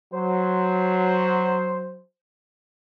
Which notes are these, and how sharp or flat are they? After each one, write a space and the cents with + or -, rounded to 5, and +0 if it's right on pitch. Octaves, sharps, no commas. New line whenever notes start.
F#3 +0 C5 +0